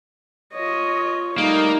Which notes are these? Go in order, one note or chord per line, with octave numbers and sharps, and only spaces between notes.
F4 C#5 D#5
G3 A3 A#3 D#4